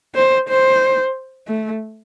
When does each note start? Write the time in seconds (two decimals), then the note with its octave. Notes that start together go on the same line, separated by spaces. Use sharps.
0.15 C5
0.49 C5
1.48 A3